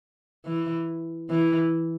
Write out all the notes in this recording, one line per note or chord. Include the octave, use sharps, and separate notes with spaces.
E3
E3